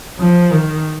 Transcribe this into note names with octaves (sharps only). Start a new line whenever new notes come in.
F3
D#3